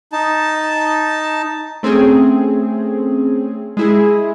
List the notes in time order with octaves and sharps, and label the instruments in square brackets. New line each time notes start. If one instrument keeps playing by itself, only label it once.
[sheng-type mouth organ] D#4 A5
[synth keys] A3 C4 C#4 G#4
G#3 E4 G#4